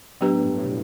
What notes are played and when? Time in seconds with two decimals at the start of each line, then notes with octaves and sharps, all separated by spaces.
0.20 A2 F#3 B3 D4 G4 B4
0.33 A2
0.44 G2
0.57 A2
0.64 B2